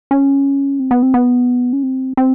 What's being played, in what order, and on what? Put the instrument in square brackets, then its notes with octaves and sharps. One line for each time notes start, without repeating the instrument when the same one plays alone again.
[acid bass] C#4
C4
B3
C4
B3
C#4
C4
C4